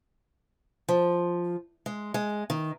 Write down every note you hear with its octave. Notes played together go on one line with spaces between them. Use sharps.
F3
G#3
G#3
D#3